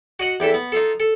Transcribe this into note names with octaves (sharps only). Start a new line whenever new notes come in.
F#4 D#5 F#5
E2 G4 A4 E5
B3
D#4 F4 A4
A4